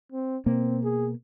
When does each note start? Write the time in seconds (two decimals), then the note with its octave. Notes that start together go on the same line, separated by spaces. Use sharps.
0.12 C4
0.46 B2 A#3 C4
0.84 G#4